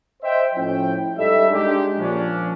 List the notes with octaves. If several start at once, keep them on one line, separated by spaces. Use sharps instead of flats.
C5 D#5 E5 G5
A2 F3 C#4 E4 G5
G#2 G3 A4 D#5 E5
G#3 D4 D#4 G4
A#2 F3 C#4 D4